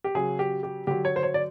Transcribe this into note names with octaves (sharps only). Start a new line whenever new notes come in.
G4
C#3 F#3 G#4
G4
G4
D3 F#3 G4
C#5
C5
C#5
D5